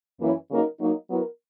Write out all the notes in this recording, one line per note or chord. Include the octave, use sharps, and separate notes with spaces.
F#2 E3 A#3 C#4 E4
C#3 F#3 A#3 D#4 A#4
F#3 A#3 D#4
F#3 B3 E4 A#4